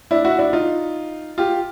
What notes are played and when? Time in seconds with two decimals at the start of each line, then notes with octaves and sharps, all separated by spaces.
0.11 D4 E4
0.25 E4 F#4
0.39 D4 E4
0.53 D#4 F4
1.38 F4 G4